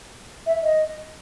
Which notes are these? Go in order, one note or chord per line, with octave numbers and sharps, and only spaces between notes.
E5
D#5